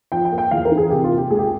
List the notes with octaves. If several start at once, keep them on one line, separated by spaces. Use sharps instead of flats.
F3 G5
G5
A#3
G5
E2 F5
A#4
E3
G#4
C3 G4
F4
A#3
G4
C#2 G#4
G4